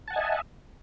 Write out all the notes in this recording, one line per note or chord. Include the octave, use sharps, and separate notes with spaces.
D#5 E5 F#5 G#5 A5